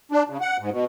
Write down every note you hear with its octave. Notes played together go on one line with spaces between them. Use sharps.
D4
C#3
F#5
G#2
B2